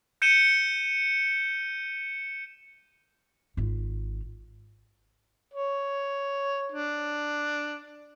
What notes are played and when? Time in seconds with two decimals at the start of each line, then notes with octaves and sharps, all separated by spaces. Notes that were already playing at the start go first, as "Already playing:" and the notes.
0.22 G6 C#7 D#7 E7 G7
3.57 G#1 F4
5.54 C#5
6.72 D4